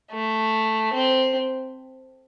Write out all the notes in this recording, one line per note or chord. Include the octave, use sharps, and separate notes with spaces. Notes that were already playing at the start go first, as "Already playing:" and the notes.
A3
C4